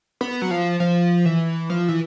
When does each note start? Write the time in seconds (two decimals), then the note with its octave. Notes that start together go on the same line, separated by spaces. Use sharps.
0.21 B3
0.42 F#3
0.51 F3
0.80 F3
1.25 E3
1.70 F3
1.89 E3